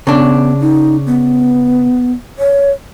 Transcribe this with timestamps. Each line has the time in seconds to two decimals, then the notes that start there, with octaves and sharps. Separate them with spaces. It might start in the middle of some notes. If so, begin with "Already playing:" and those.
0.07 C#3 B3 D4
0.61 D#4
1.06 B3
2.39 C#5